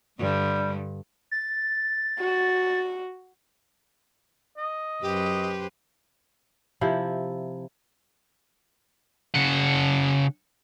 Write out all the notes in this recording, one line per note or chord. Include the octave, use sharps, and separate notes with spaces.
G2 D3 G3
A6
F#4
D#5
F#2 G4 B4 C5
C3 F3 E4
C#3 F#5